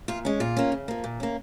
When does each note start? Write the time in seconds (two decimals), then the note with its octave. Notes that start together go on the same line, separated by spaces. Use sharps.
0.08 A#2 F4
0.25 G#3 C#4
0.40 A#2 F4
0.57 A#3 C#4
0.72 C#3
0.88 F3 A#3
1.04 A#2
1.20 A#3 C#4